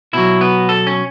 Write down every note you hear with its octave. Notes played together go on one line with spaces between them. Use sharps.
B2 F#3 E4
B3
A4
C#4